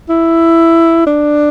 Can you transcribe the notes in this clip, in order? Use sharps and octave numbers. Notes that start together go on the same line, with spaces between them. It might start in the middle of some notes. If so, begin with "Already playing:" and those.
E4
D4